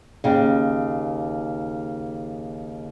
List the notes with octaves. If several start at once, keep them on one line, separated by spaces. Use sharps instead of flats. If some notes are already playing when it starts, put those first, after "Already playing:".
D#2 C#3